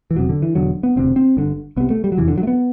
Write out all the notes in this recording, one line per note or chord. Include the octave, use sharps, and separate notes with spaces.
E3
E1 E2 C3 F#3
D3
E3
E1 E2 D3 F#3
B3
E1 D2 C3 C4
C4
G1 G2 D3
C2 C3 B3
A3
G3
F#3
F#1 E2 C3 E3
D3
F#3
A3
B3